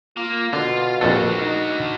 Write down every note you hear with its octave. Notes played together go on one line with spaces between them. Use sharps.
A#3 F4
B2 D3 F4
A#1 F2 D4 F#4 A4
D#4